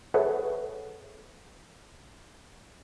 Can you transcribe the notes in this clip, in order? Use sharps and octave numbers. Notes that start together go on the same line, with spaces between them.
G#4 A4 B4 C#5 E5 F#5